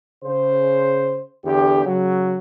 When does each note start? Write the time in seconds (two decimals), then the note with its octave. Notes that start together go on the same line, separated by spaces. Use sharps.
0.24 C#3 C5
1.44 E2 D3 G4
1.85 C#3 F#3